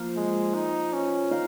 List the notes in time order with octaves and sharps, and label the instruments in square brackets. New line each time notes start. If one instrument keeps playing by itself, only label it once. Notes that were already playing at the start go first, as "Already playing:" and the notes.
Already playing: [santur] F3 A#3 F4 C5
[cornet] G#3
D#4
C#4
[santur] D#4 A#4 F5